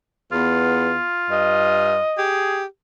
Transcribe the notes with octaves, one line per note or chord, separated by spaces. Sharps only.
E2 B3 F4
G2 D#5
G4 G#4